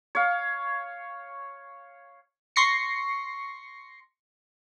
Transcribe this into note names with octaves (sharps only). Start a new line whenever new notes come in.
C#5 F5
C6 C#6 A#6 C7 C#7